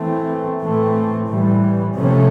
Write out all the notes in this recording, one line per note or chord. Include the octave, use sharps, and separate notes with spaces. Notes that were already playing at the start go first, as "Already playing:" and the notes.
Already playing: E3 A3 C4
A2 E3 A3 C4
A2 E3 G3
C3 F3 A3 C#4